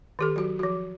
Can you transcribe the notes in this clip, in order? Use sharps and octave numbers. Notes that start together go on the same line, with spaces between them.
D#3 G4 A4
F#3 F#4
F3 F#4